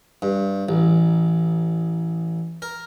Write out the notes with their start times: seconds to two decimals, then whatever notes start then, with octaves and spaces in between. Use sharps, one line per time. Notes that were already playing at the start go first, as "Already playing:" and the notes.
0.22 G2
0.69 A1
2.62 A#4